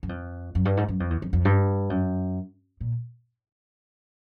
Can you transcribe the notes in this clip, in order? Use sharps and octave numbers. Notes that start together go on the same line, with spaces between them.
F#2
F2
F#2
G2
G#2
F#2
F2
E2
F2
F2
G2
F#2
A#2